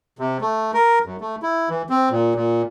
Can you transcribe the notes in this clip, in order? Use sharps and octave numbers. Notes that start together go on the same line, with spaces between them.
C3
A3
A#4
F#2
A3
E4
E3
C4
A#2
A#2